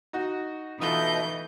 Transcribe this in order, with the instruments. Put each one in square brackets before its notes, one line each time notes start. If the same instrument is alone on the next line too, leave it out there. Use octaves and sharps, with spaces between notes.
[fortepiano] D#4 F#4
[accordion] B2 A3 D#5 [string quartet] E3 G6 [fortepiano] D#4 F4 A4